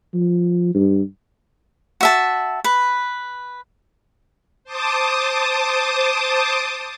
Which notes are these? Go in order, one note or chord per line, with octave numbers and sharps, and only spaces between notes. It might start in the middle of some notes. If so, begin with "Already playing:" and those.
F3
G2
F#4 E5 A5
B4
C5 A5 D6 D#6